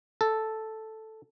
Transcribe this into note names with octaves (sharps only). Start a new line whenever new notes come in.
A4